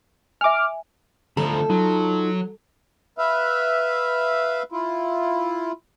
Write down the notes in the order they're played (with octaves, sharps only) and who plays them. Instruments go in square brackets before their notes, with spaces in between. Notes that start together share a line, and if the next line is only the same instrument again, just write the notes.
[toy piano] E5 G#5 [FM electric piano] D6 F6
[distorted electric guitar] D2 F3 [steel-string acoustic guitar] A4 [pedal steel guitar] A#5 B5
[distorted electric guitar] F#3 [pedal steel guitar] D#4 F4
[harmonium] B4 E5 F5
E4 F4